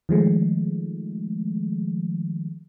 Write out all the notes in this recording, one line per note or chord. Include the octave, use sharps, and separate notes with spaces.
D#3 F3 G#3 A3